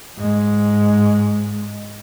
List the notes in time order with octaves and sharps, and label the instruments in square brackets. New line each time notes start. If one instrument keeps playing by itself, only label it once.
[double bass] G#2 G#3